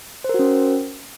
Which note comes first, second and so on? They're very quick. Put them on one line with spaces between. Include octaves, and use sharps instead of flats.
C5 A#4 F#4 C#4